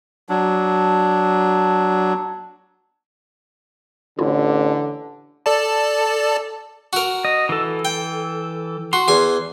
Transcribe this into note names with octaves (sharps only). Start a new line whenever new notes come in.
F#3 D4
A1 D3 E4 F4
A4 D5 A5
F#4 A#4
D#5
E3 A4
G5
F#4 C6
E2 G#5